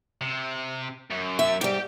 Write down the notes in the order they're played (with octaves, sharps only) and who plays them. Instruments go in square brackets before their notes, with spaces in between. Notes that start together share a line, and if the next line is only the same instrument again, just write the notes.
[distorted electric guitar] C3
F#2
[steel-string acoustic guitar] E5
[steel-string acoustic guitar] G#2 G3 [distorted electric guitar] G4 G5